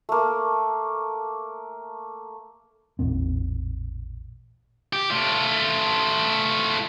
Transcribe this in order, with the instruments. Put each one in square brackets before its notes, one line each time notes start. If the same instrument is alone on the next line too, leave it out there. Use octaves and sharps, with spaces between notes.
[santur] A3 A#3
[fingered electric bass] A1 E2 A#2 C4
[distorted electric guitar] G4
A3 F4